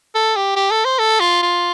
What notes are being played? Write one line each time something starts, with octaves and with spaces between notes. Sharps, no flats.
A4
G4
G4
A4
C5
A4
F4
F4